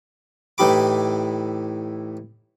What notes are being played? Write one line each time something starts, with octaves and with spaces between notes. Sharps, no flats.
A2 E3 D#4 G4 B5 D6